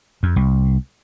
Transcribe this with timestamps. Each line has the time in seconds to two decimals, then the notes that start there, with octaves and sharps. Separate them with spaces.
0.23 F2
0.36 C2